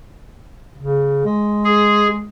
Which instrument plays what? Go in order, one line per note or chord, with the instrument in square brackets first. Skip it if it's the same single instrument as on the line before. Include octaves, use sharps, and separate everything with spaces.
[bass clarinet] C#3
G#3
[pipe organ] G#4